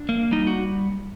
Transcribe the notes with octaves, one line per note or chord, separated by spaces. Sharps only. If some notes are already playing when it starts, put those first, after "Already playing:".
Already playing: D4
A#3
G3 D#4
F#4